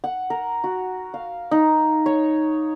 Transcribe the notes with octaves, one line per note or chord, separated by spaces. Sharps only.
F#5
A#4
F#4
F5
D#4
C#5